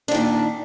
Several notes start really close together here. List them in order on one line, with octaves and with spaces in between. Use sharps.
D4 D#3 A#2